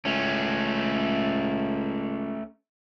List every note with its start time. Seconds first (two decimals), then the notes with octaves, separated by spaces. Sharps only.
0.05 C#2 A3 C#4